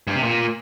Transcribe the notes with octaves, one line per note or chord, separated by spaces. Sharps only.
G2
C3
A#2